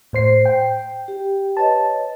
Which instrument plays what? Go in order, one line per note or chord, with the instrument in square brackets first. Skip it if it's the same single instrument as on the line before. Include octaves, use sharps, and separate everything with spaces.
[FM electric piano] A2 C5 C7
G5
[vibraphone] G4
[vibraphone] B4 C#5 D#5 [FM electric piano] A5